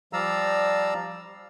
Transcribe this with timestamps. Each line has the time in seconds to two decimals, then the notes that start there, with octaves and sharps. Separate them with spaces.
0.13 F3 G3 D5 F5 A#5 E6